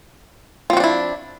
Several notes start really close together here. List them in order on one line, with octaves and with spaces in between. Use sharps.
F3 C4 F#4 D4 E4